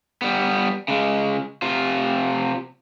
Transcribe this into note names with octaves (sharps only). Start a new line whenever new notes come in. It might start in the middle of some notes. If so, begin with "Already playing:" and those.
G3 B3
C#3 G#3
C3 F4